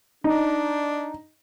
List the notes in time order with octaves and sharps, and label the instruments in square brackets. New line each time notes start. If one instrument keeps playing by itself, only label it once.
[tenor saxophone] D4 [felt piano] D#4